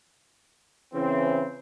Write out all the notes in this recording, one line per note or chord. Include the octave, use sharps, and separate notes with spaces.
C#3 E3 C4